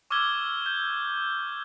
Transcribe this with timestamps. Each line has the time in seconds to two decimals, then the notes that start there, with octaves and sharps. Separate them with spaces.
0.10 C#6 D6 E6 F6 G#6 G7
0.66 G6